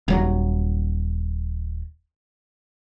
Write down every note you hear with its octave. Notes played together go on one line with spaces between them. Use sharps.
D#1 F#3